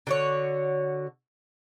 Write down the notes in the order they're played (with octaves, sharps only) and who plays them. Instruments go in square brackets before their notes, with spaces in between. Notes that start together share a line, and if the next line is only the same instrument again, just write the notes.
[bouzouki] D3 F#4 C#5